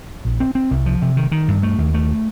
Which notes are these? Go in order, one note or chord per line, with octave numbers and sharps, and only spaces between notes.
A#1
C4
C4
C2
F3
C3
D#3
D#3
G2
A3
D#2
A3